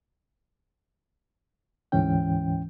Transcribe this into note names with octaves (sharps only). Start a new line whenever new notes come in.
D2 G#2 E3 C#4 G5